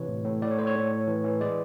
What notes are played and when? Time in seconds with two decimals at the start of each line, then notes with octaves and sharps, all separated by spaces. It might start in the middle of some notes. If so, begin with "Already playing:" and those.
Already playing: C3 E3 C#5
0.08 A2
0.25 A2
0.42 A2 D5
0.51 C#5
0.58 A2 C5
0.67 C#5
0.75 A2
0.92 A2
1.08 E3
1.24 E3
1.41 G#3 D5